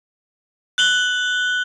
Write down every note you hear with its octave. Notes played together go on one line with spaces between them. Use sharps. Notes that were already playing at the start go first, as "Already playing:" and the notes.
F#6 F#7 G7